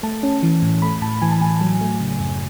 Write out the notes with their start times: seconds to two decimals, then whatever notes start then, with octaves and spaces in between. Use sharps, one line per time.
0.03 A3 A5
0.23 C#4
0.43 E3
0.62 A2
0.82 A3 B5
1.02 A2 A5
1.22 E3 G#5
1.32 A5
1.41 A2 G#5
1.61 F#3
1.81 A3
2.01 C#3
2.20 F#2